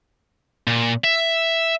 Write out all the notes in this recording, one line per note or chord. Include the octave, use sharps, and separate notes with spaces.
A#2
E5